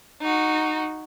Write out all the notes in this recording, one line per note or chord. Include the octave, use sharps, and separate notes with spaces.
D#4 F#4